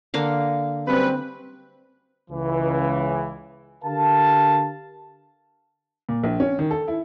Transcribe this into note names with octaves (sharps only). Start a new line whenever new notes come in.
D3 A#3 F5
F#2 G3 C4 B4
C#2 C#3 E3
D3 G4 A#4 F5 A5
A#2
A#1
C#4
D#3
A4
E4